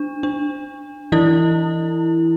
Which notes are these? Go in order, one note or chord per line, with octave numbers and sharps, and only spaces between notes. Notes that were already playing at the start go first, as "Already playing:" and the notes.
Already playing: D4
D4
E3 E4